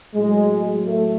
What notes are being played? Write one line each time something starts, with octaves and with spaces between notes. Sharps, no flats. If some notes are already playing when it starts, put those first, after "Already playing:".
A2 F#3 G#3
A3